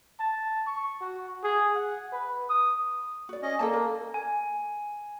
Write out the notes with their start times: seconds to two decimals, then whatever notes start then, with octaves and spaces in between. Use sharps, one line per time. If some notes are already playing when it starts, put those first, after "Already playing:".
0.20 A5
0.67 C#6
1.01 F#4
1.44 G#4
1.75 F#5
2.12 B4
2.50 D#6
3.29 F#4 D5
3.43 C#4 D#5
3.59 A#3 A4 D5 A5
3.73 A#4
4.14 G#5